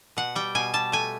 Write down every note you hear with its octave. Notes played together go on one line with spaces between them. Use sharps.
B2 F#5
G3 G5
B2 G#5
G3 A5
A3 G#5